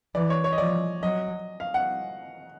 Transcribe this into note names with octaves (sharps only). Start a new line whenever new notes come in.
E3 D5
C#5
C#5
D#5
F3 D5
F#3 D#5
F5
F#5